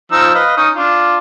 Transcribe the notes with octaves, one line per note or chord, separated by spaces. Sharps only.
F3 D#4 E6
B4 D#5 F5
C#4 D#4 D#6
D4 F4